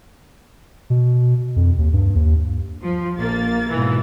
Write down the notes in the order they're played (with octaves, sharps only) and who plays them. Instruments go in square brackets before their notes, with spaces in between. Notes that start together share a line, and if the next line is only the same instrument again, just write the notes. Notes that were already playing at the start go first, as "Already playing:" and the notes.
[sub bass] B2
F2
D#2
G2
D#2
[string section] F3
A#1 A#3 A6
G#2 B2 E3